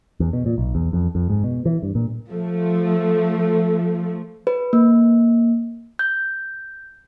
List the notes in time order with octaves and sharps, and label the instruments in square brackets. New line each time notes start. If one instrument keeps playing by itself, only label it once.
[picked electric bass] E2
B2
A#2
B1
E2
F2
F2
G#2
B2
E3
G2
A#2
[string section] F3 A3
[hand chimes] B4
A#3
G6